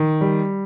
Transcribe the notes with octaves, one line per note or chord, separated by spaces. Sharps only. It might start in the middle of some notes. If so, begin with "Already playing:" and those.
Already playing: D#3
G3